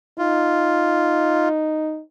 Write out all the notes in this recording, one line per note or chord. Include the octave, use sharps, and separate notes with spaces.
D#4 F4